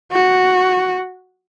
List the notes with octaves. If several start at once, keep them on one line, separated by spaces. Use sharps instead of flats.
F#4